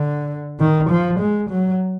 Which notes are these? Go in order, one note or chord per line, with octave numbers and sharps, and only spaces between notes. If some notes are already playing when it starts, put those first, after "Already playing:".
Already playing: D3
D#3
F3
G#3
F#3